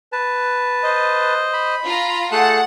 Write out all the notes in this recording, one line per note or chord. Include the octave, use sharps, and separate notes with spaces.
B4 A5
C5 D#5
B5
F4 A#5
A3 G#4 A4 F#5 A5 F#6